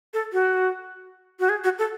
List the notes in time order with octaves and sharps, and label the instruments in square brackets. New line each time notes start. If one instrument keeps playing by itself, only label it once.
[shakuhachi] A4
F#4
F#4
G#4
F#4
A4